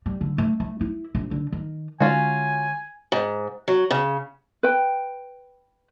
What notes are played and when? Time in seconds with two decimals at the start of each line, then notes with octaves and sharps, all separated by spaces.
0.06 G3
0.21 D3
0.38 A3
0.60 A3
0.81 E4
1.15 A#1
1.31 D3
1.52 D#3
2.00 D3 G#3 C#4 F4 F#4 G#5
3.12 G#2
3.68 F#3
3.91 C#3
4.63 B4 G5